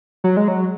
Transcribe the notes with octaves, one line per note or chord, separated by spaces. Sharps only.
F#3
G#3
F#3